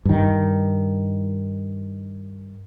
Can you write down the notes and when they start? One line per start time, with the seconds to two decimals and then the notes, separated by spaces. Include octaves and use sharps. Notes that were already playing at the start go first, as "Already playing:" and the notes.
0.05 G2 D#3